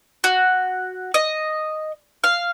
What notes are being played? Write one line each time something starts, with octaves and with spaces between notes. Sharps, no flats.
F#4
D#5
F5